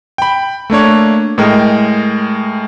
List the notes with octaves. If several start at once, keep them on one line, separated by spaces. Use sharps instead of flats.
G5 B5
A3 A#3 D4 C#5
A2 G#3 A#4 G5